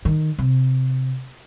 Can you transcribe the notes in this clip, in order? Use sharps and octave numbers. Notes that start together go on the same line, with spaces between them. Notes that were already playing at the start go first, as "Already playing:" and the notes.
D#3
C3